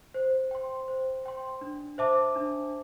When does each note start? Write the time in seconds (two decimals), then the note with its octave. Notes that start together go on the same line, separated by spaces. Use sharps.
0.14 C5
0.51 G5 C6
0.88 C5
1.25 G5 C6
1.61 D4
1.98 C5 E5 A5 D6
2.35 D4